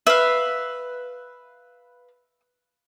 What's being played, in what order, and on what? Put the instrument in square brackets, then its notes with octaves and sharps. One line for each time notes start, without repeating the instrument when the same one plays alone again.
[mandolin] B4 F5 [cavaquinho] E5